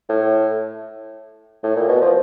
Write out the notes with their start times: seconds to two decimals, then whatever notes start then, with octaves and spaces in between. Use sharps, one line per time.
0.09 A2
1.63 A2
1.76 A#2
1.88 B2
2.01 F3